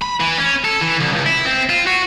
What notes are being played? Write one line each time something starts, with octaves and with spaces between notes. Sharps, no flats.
B5
E3
C#4
A4
E3
C2
C#2
E4
C4
F4
F#4